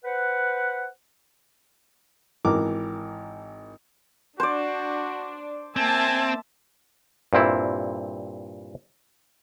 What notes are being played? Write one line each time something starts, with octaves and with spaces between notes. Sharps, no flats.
B4 C5 F#5
G#1 E3 A#4 D6
D4 F#4 C5 D5
A#3 C4 E5 G#5 A5
G2 A#2 C4 E4